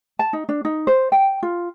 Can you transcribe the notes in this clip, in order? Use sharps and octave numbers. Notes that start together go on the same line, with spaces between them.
A5
D#4
D4
D#4
C5
G5
F4